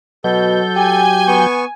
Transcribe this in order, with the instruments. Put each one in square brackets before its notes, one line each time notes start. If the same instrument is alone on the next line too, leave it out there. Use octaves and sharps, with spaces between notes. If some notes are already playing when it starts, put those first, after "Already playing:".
[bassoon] B2 [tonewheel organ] F#3 G6 [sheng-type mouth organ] A4
[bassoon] G4 [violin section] G#5
[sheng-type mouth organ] B3 C#6